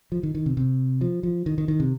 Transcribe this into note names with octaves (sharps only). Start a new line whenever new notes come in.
F3
D#3
D#3
C3
C3
F3
F3
D#3
D#3
D#3
C3